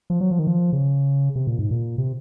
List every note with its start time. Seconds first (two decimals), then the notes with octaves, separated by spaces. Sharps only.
0.10 F3
0.21 F#3
0.31 F3
0.39 D#3
0.47 F3
0.73 C#3
1.36 C3
1.47 A#2
1.59 G#2
1.71 A#2
1.98 C3